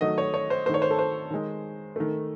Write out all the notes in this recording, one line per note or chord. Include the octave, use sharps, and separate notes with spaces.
D#3 F#3 A3 D#5
C#5
C#5
C5
D#3 A3 C5 C#5
C5
A4
C5
D#3 G#3
D#3 A3